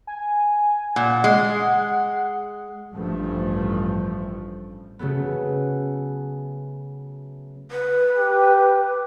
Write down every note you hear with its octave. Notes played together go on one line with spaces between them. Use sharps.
G#5
A#2 F#5
G#3
A1 G2 F3 A3
C#3 F#3 A3 B3
B4
G4